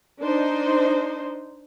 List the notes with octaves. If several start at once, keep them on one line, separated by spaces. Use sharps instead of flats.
D4 D#4 C5